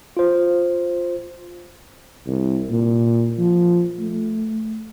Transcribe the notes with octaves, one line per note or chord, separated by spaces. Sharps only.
F4 C5
C2
A#2
F3
A3